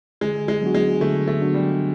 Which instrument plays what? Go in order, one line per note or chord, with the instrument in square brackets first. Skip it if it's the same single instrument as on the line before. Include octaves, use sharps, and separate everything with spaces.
[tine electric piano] D3 [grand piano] G#3
[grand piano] G#3
[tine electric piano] F#3 B3 D4 F#4
[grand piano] G#3
[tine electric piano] D3 [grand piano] A3
[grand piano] A3
[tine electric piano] F#3 B3 D4 F#4
[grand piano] G3